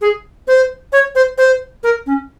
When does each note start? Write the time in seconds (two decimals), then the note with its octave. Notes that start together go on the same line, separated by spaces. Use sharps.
0.01 G#4
0.47 C5
0.92 C#5
1.15 C5
1.38 C5
1.83 A#4
2.06 C#4